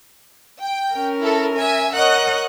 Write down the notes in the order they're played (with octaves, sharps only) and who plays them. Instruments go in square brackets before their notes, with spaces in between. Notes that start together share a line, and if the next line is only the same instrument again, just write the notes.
[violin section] G5
[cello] C#4 A#4
[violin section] E4 A4
E5 G#5
[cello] A#4 C#5 [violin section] D#5 F#5 F#6